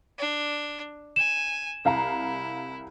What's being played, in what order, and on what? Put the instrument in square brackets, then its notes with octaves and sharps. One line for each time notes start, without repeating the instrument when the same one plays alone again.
[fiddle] D4
[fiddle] G#5 [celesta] E7
[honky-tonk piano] C2 F5 A#5 [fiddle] E4